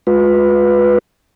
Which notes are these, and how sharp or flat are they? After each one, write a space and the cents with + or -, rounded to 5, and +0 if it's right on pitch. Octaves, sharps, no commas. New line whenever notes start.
G#3 +5 F4 +40 B4 +0